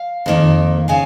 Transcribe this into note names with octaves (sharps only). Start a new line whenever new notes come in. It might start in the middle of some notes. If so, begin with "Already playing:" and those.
Already playing: F5
F2 D#3 A#3
C#3 F5 G#5